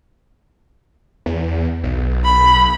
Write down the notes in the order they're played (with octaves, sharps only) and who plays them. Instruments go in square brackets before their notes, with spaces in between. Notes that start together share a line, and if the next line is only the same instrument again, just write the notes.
[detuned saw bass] E2
B1
[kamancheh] B5